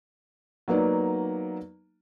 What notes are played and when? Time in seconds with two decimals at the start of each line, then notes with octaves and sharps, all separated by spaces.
0.68 F#3 A#3 B3 D#4 D5